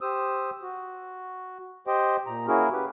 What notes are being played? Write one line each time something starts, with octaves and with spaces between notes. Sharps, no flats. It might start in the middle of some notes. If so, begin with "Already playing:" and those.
G4 C5 D#6 E6
F#4
G4 C5 D#5 G5
A#2 A#5
A#3 C#4 E4 F#4 G#4 A#4
G4 B4